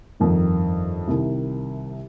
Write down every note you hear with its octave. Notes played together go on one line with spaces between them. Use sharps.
G1 F2 D#3
C2 C3 D#3